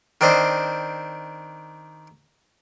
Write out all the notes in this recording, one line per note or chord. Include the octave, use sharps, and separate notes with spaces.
D#3 C4 D4 C5 D#5